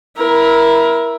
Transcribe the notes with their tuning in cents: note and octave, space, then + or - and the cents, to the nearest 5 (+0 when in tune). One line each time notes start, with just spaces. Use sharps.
E4 +0 A#4 +20